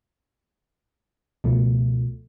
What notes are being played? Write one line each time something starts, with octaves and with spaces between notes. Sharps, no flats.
C#2 B2 F3 A3